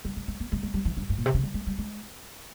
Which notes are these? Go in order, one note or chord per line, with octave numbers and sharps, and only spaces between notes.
G3
G#3
G#3
A#3
G#3
G#3
G3
E3
G2
G#2
A#2
C3
C#3
G3
G#3
G3
G#3